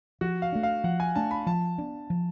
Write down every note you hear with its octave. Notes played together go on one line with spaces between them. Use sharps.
F3 F#4
F5
A3 D4
F5
F3 F#5
G#5
A3 D4 A5
B5
F3 A5
B3 D4
F3